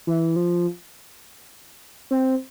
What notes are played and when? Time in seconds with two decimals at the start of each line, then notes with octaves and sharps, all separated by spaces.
0.07 E3
0.36 F3
2.11 C4